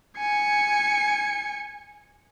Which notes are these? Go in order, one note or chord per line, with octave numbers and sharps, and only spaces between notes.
G#5 C#7